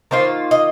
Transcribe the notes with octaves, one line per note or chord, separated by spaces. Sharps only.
D#3 A#3 F4 C5
D#5